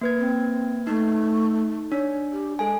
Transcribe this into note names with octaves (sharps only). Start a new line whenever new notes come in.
A#3 B4 G#6
C4
A3 D#4
D4 C#5
G4
G#3 A4 G#5